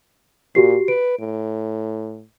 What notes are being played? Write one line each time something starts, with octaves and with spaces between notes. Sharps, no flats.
A#2 F#4 G4 C7
B4 D7
A2